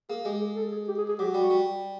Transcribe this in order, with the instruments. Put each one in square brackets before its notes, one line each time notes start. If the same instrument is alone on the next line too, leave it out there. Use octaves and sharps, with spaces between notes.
[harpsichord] A#3 [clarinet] G#4
[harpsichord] G#3 [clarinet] G4
[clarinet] G#4
A4
G#4
G4
G#4
G#4
[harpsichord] F#3 [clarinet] G4
[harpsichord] G3 [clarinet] F#4
[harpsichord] G3